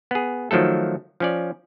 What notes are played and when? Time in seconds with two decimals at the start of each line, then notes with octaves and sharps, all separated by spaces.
0.11 B3 G#4
0.51 D#3 F3 F#3 A3 A4
1.20 F3 C#4 D5